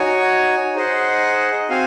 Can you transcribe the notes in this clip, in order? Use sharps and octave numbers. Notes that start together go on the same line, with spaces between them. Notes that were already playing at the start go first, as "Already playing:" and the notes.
Already playing: D#4 F#4 C#5 G#5
D#4 G#4 C5 D#5 F#5
C4 F#4 C5 F5 G#5